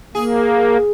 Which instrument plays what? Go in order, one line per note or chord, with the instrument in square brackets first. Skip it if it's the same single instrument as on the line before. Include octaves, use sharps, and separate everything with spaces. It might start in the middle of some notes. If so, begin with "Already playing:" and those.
[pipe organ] A#3 [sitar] G#4